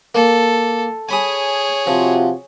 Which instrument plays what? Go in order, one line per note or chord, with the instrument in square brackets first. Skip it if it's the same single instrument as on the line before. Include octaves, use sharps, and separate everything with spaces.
[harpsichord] A#3 [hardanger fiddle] A4
[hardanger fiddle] G#4 C#5 [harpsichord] G#5 B5 D#6
[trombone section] C3 F4 F#4 [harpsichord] F3